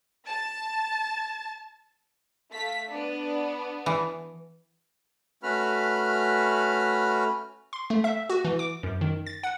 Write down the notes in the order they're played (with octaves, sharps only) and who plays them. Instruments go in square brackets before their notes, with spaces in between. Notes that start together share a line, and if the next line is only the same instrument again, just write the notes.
[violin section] A5 A6
A3 F5 B6
B3 D4
[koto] E3
[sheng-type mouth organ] A3 C#4 F#4 B4 B5 F6
[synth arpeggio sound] C6
A3
E5
F#4
E3
D6
F#2
D#3
A6
F#5